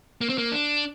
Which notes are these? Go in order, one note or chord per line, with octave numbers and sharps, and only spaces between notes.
A#3
C4
A#3
D4